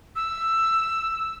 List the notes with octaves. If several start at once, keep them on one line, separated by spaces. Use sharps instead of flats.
E6